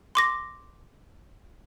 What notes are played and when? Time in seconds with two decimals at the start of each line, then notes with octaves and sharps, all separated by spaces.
0.15 C6 D6 A#6